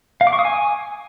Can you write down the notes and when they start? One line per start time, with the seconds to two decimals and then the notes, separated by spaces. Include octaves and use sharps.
0.21 F5
0.27 D6
0.33 C#6
0.39 D#6
0.45 G#5